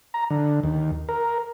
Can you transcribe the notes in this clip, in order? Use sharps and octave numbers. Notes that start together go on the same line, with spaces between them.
A#5
D3
D#2
A#4